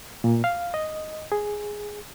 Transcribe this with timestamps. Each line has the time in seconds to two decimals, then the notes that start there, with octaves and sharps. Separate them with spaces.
0.24 A#2
0.44 F5
0.74 D#5
1.32 G#4